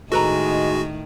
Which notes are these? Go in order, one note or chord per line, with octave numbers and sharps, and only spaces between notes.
A2 D#3 G#3 F#4 A4 B4 A#5